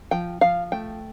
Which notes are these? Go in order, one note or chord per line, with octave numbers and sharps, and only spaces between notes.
F3 G5
F3 F5
A3 G5